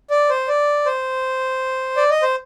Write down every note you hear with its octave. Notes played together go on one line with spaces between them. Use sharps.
D5
C5
D5
C5
D5
D#5
C5